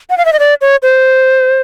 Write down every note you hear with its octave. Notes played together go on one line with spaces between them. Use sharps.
F#5
F5
E5
D#5
D5
C#5
C5